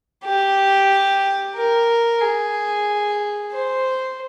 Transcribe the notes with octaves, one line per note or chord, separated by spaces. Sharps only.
G4
A#4
G#4
C5